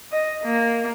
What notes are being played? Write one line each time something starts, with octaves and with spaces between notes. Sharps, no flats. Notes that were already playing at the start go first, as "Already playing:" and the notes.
D#5
A#3